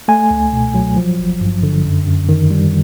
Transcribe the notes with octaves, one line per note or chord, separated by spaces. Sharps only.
A3 G#5
C#2
B2
F#3
F3
G#1
G2
D3
F#2
F#2
D#3
G3